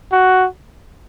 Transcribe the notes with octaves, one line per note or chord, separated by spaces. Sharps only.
F#4